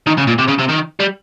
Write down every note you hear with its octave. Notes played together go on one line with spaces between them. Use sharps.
D#3
C#3
A#2
C3
C#3
C3
D#3
G3